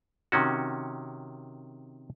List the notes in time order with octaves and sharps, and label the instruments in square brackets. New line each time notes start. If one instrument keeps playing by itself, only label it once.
[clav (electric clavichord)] C3 D#3 C#4 F#4